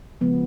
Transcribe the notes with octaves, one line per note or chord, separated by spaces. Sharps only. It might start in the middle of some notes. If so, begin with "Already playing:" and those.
C#3 F3 G#3 B3